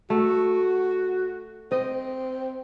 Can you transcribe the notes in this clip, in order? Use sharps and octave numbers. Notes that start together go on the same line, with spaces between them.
A3 F#4
C4 D#5